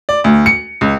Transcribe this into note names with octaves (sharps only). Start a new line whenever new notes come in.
D5
D2
C#7
C#2